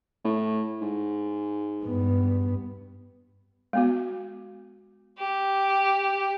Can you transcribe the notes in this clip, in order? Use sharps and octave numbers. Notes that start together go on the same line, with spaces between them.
A2
G#2
G2 B3
G#3 B3 F#4
G4